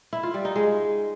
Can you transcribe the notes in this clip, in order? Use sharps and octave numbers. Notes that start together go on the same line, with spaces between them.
E4
F4
G3
D#4
G#3